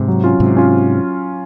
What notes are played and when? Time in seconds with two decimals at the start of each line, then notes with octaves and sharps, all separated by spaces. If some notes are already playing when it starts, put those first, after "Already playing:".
Already playing: G#2 C3
0.08 F#3
0.24 C#4 F4
0.40 G#2 C3 F#3
0.57 C#4 F4